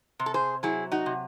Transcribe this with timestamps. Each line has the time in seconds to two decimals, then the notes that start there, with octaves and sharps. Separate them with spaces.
0.20 C3
0.26 A4
0.34 G#4 C5
0.63 F#3 E4 G#4
0.92 D#4 F#4
1.06 C3